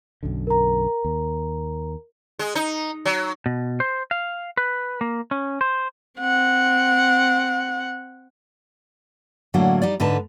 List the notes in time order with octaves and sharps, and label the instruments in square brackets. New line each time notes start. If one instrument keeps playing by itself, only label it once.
[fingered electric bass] B1 F#2 D3
[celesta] A#4 A#5
[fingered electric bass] D#2
[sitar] G#3
D#4
F#3
[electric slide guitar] B2
C5
F5
B4
A#3
C#4
C5
[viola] C4 F#5
[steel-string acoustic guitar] A2 D3 F#3 A#3 D4 F#5
G3 D#4 D5
G#2 D3 D#4 B4 A5